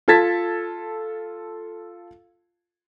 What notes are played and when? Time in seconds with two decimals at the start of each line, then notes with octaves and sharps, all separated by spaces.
0.08 F4 A4 A5 G#6 A6 B6